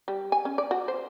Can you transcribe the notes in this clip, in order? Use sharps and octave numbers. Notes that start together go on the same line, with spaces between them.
G3
G#5
C#4
D5
F#4
C5